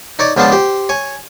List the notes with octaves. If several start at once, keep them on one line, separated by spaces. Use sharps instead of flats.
D#4 C#5 D5
C#2 F3 B3 D4 C5 A5
G4 C5
C#5 G#5